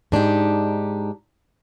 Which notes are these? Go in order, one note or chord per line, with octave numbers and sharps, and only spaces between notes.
G#2 D4 D#4 G4